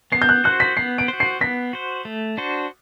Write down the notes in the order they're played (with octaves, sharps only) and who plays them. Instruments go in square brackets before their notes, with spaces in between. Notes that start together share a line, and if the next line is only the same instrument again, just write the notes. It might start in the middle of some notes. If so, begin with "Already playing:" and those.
[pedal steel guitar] B3 [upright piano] C7
[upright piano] G6
F#6
[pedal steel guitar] F#4 C5 [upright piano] F#6
[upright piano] B6
[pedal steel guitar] B3 [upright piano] C7
[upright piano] D7
[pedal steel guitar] C5
F#4
[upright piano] C7
[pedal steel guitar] B3 [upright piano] B6
[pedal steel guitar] F#4 C5
A3
D4 F#4 C5